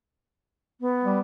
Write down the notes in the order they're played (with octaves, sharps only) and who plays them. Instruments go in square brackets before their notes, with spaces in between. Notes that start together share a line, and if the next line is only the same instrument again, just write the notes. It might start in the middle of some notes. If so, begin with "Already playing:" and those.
[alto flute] B3
[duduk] G3